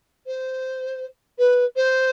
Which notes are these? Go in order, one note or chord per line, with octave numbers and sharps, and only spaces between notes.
C5
B4
C5